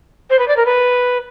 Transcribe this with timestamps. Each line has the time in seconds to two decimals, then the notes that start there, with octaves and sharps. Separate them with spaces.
0.30 C5
0.39 B4
0.48 D5
0.57 A#4
0.66 B4